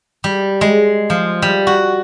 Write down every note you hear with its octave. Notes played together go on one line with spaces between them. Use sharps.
G3
G#3
F3
G3
F#4